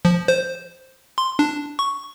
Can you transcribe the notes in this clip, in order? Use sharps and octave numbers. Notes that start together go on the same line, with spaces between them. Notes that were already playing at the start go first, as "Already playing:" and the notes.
F3
C5
C6
D4
C#6